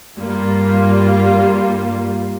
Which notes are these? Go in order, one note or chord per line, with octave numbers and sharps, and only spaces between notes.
G2 G3 A#3 F4